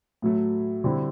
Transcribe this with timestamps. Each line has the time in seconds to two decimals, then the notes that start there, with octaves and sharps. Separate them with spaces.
0.22 A2 F#3 A3
0.84 D3 G3 C4 E4